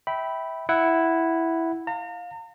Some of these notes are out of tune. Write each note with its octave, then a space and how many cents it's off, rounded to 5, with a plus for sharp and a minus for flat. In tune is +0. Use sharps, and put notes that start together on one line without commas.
E5 -20 G5 -15 B5 +0
E4 +0 F#5 +5
F5 +25 A#5 -40